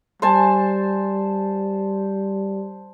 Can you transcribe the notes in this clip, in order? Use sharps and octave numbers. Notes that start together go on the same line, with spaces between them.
G3 C5 G#5 A5